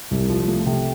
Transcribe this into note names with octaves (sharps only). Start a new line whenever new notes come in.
C2
F3
A3
C3